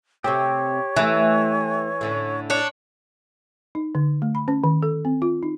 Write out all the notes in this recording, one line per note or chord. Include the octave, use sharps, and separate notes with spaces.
C3 A3 C4 G4 C#5
E3 A3 E4
A2 D3 C#4
D4 C#5 D5
D#4
D3
A3
B5
C#4
D#3
A4
C4
F4
D#4